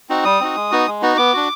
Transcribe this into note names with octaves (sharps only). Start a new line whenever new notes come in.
C4 D#4 F#4
G3 D#6
C4 D#4 F#4
G#3
B3 D#4 F#4
G#3
B3 D#4 F#4
B3 D6
D4 F#4